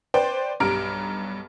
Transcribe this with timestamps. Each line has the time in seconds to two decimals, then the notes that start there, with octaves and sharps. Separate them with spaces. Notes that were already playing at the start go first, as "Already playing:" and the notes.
0.14 B4 C5 D5 G5
0.60 B1 G2 G3 A#5 F6 D7